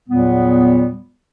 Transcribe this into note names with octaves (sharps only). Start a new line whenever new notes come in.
E2 A#2 F#3 G3 B3